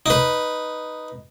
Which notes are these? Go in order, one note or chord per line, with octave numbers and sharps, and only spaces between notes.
D#4 B4